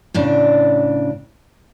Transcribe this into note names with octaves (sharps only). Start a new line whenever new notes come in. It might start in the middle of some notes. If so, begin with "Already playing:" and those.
A2 C#3 D4